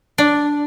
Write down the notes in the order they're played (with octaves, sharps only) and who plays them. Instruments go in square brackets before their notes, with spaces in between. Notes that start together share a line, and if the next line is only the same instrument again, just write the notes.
[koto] D4